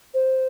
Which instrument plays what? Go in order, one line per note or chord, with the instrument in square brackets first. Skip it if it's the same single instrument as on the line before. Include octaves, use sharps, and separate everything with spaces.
[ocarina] C5